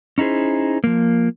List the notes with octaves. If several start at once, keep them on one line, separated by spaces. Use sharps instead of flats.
C#4 D#4 E4 G#4 C5
F3 A#3